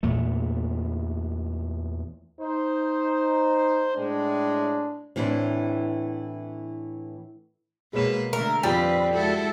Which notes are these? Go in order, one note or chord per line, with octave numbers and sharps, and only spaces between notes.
E2 A#2 A3
D#4 C5
A2 G#3 D4
A2 E3 C4 D4 E4
B2 G#3 A#3 B4 C#5 E7
D3 A3 A#4
F2 F3 G3 C4 B4
G#3 E4 F#4 A4